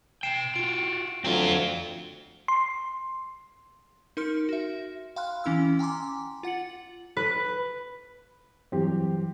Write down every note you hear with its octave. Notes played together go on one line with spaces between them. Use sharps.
B2 G5 C7 D7 E7
F4 F#4 D7
D2 F#3 C4 F4
C6
D#4 A#4 C6 F6 C#7
F#4 E5
F5 G5 B5 C6 F6 F#6
E3 C#4 E4 B5 E6
G5 G#5 A#5 C6 D6
F4 F#5 A6 C#7 F#7
B4
G2 E3 F#3 C4 G4